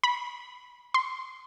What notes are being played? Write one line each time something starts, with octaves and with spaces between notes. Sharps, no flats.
B5
C6